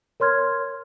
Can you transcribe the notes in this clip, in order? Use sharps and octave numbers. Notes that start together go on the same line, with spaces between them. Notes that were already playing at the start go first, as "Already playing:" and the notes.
A#4 C#5 C6 F6 G#6